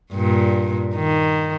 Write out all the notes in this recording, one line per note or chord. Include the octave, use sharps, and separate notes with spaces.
G2 A#2
D#3